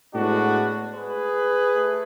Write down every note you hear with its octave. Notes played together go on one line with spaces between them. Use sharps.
A2 G#3 B3 D4 F#4
G#4 B4
A3